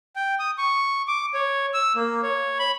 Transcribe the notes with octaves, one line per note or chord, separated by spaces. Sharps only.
G5
D#6
C#6
D6
C#5
E6
A#3
C#5
B5